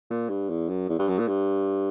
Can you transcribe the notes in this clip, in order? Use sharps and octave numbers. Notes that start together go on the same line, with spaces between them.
A#2
G2
E2
F#2
E2
G2
F#2
A#2
G2